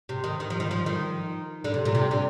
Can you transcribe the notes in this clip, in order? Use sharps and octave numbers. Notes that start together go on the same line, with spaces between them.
C3
D#3
D#3
F3
D#3
F3
D#3
D3
C3
A#2
C3
D3